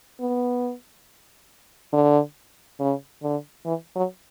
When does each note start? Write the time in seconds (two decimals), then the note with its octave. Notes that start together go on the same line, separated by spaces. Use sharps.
0.20 B3
1.93 D3
2.80 C#3
3.23 D3
3.66 E3
3.96 F#3